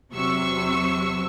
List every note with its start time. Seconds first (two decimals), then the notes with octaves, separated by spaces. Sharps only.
0.13 E2 C3 F#3 C#6 E6